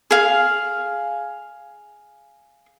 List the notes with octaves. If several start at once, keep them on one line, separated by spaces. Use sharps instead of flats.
G#4 F5